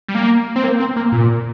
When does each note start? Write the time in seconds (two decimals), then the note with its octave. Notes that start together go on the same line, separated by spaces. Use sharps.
0.08 G3
0.15 A#3
0.56 C4
0.64 A#3
0.80 C4
0.96 A#3
1.12 A#2